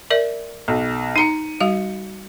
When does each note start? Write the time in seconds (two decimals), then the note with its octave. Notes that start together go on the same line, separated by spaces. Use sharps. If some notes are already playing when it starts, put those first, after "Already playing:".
0.11 A#4 D5 E5
0.68 B1
1.16 D#4 A#5 C#7 D#7
1.61 G3 F#4 F5